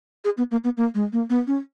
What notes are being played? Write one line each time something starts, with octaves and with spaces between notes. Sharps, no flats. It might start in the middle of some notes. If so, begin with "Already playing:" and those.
G#4
B3
A#3
B3
A#3
G#3
A#3
B3
C#4